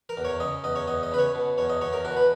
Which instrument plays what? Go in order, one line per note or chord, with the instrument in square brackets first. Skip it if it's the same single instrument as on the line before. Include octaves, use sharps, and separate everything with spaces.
[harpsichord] A#4
E2
C#5
C#3 D#5
E2 D#5
C#5
E2 D#5
D#5
C#3 B4
C#5
B2
E2 C#5
D#5
E2 C#5
A#4
B2 F#4
B4